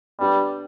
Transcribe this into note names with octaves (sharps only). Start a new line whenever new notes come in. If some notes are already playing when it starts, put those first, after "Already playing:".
G3 B3 D4 G4 B4